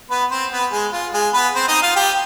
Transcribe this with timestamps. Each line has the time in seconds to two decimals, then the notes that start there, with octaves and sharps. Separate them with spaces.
0.10 B3 B4
0.30 C4 C5
0.51 B3 B4
0.72 G#3 G#4
0.92 F4
1.13 G#3 G#4
1.34 B3 B4
1.55 C4 C5
1.68 D#4 D#5
1.82 F4 F5
1.96 G4 G5